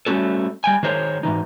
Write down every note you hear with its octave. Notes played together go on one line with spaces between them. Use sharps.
G3 A3 C#4 F#4 A4
G3 G5 G#5
D#3 G#3 G#4 A#4 C5 C#5
G#2 C#3 E3 D#4